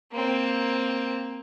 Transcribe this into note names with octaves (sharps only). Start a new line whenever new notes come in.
A#3 C4